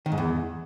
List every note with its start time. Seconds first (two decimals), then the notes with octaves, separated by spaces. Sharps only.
0.06 D#3
0.12 G#2
0.18 E2